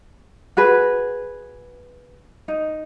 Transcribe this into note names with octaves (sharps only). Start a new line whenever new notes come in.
F#4 G#4 B4
D#4